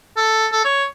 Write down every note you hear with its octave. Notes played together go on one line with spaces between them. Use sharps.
A4
A4
C#5